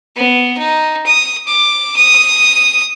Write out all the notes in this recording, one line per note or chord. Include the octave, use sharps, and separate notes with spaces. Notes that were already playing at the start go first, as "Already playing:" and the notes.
B3
D#4
D#6
D6
D#6